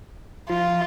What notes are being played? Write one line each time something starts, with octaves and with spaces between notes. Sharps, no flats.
F3 F4